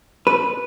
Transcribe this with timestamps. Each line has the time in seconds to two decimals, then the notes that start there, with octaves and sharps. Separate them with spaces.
0.27 B4